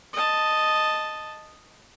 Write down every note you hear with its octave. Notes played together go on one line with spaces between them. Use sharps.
D#5 A5